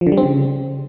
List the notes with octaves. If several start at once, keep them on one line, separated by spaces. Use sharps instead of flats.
F3
D3
G3
C4
C#3